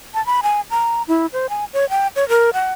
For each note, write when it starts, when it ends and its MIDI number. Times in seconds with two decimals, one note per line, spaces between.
0.14 0.24 81
0.26 0.41 83
0.43 0.61 80
0.70 1.03 82
1.08 1.26 64
1.33 1.49 72
1.49 1.65 80
1.74 1.88 73
1.90 2.07 79
2.16 2.28 73
2.29 2.50 70
2.54 2.73 78